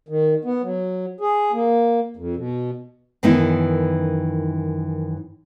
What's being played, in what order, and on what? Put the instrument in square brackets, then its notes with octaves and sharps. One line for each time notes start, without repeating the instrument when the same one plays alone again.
[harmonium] D#3
B3
F#3
G#4
A#3
F2
B2
[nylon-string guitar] F#2 D#3 E3 B3 D#4 E4